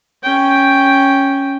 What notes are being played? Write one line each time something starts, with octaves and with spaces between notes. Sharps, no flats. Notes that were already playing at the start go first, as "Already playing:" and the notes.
C#4 G5